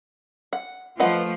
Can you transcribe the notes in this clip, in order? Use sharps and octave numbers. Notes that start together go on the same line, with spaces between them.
F#5
F3 A3 B4 D#5 F#5